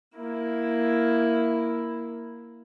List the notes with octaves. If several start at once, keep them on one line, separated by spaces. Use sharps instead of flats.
A#3 E4